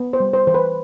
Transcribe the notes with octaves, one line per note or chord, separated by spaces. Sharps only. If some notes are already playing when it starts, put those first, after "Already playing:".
Already playing: B3
C5
G3
C5
E3 C5
B4